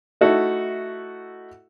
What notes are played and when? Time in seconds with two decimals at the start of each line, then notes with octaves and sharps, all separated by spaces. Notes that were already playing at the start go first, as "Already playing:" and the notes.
0.21 A3 D#4 E4 F#4 A4